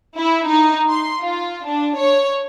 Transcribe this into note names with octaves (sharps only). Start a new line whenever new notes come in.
E4
D#4
C6
F4
D4
C#5